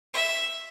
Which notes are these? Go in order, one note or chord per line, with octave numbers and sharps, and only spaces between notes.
E5